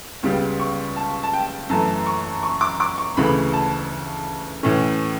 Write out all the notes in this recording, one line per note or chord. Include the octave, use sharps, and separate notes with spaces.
C#2 C#3 G3 B3
C#6
A5
A5
G5
F#2 E3 A3 A5
C#6
C#6
D6
D6
C#6
D2 C#3 E3 A3 B5
A5
A2 E3 A3 C#4